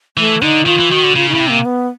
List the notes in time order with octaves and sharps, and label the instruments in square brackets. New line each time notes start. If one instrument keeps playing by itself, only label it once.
[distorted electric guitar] E3 [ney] A3
[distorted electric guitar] D3 [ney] D#4
[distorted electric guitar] D#3 [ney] F4
[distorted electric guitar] E3
[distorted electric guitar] D#3 [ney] F#4
[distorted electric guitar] D3
[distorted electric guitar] C#3 [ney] F4
[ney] D#4
[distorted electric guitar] C#3 [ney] E4
[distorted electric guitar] C3
[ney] A#3
B3